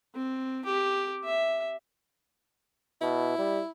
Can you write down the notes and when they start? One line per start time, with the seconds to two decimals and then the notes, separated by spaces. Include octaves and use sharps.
0.15 C4
0.65 G4
1.24 E5
3.01 B2 E4
3.38 G3